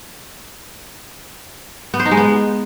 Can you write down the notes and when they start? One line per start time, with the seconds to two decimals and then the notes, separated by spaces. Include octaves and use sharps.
1.94 B3
2.00 C5
2.05 D#4
2.11 G#3
2.17 B3